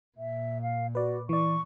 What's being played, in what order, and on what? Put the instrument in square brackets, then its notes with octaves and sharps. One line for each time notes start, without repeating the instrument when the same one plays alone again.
[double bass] A#2 [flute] E5
[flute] F5
[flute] F#4 [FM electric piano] B4 D5
[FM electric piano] E3 D5 [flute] C#6